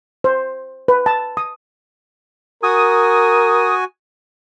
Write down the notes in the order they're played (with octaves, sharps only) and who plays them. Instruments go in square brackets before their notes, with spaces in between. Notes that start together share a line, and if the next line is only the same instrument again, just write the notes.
[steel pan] C5
B4
A5
D#6
[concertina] F#4 G#5 [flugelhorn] A#4 [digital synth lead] D#6